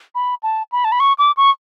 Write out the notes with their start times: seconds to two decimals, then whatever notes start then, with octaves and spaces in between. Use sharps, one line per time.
0.15 B5
0.43 A5
0.72 B5
0.85 A5
0.92 B5
1.00 C#6
1.18 D6
1.37 C#6